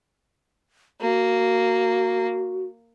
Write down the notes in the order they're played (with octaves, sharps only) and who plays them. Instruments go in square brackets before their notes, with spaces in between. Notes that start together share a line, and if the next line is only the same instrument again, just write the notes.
[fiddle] A#3 [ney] F#4